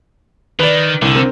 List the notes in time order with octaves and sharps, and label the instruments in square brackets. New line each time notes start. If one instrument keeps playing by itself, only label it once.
[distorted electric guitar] D#3 [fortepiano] B4 D5
[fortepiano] C2 [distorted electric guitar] D3
[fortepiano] C4 A#4